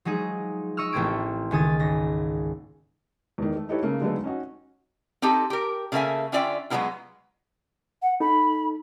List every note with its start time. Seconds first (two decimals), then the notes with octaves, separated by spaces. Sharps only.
0.05 F3 F#3 G#3 D#4 G#4
0.77 D#5 C#6 E6 F6
0.93 A1 A3 A#3 C4 G#6 D7
1.51 C#2 D#3 G#5 D#6 A6
1.79 G#1 A#6
3.38 E2 D#3
3.56 A3
3.69 D#4 E4 G4 A4 B4 C#5
3.83 C#3 A3 A#3
4.01 D3 F#3 G#3 A3 B3 D#4
4.24 C#4 D#4 F#4
5.22 C4 D#4 G4 A4
5.50 G4 A#4
5.92 C#3 A3 A#3 D#4 E5 G#5
6.32 D3 C#4 F4 D5 E5 G5
6.70 F#3 G#3 A3 B3 E4 F4
8.02 F#5
8.20 D#4 A4 B5